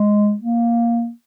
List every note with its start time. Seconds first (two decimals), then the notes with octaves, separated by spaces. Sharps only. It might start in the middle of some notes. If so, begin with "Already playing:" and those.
Already playing: G#3
0.41 A#3